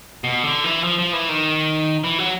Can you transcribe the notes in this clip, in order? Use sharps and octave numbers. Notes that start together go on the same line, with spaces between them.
B2
D3
E3
F3
F3
E3
D#3
E3
F#3